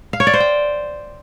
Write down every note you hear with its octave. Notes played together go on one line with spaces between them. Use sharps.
F5
C#5
D5
C5
G5